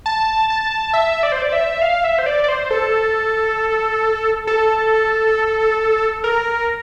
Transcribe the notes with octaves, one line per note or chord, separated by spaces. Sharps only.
A5
A5
E5
D5
C5
D5
E5
F5
E5
C5
D5
D5
C5
A4
A4
A#4